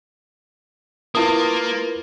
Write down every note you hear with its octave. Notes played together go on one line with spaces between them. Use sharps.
A#3 E4 F4 A#4 B4 D#6